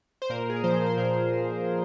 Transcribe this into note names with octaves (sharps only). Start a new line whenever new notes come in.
C5
A#2 A#4
G#4
A#4
F3 C5
C5
A#2 A#4